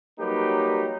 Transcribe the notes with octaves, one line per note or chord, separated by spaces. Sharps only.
F#3 G3 A#3 D#4 G4 B4